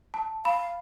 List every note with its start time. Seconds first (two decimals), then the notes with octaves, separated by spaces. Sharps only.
0.14 A5
0.45 F5 B5